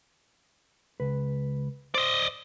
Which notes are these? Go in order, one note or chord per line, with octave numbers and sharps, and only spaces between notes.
C#2 B4
C5 D5 D#5